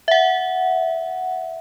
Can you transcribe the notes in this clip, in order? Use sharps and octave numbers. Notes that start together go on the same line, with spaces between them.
E5 F#5